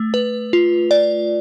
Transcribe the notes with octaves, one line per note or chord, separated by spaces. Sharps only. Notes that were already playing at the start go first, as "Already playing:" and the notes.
Already playing: A3
B4
F4
D5